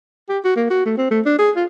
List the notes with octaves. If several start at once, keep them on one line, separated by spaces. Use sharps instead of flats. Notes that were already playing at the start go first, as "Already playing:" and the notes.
G4
F#4
A#3
F#4
A3
C4
A3
D4
G#4
F4